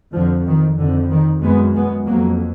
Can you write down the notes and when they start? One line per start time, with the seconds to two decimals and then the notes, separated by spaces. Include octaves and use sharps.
0.14 F2 D3 F3
0.47 D#3
0.78 F2 D3
1.11 D#3
1.42 F#2 G#3 B3
1.74 G#3 B3
2.06 F2 F#3 A#3